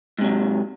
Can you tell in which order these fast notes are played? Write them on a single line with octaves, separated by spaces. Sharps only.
G#2 C3 F#3